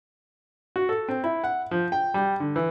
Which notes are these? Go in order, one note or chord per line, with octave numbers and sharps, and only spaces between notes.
F#4
A4
C4
E4
F#5
F3
G5
G3
D3
E3